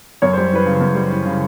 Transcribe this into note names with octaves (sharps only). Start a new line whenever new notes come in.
F#2 C#5
G3 C5
E3 B4
C#3
F#2
G3
E3
C#3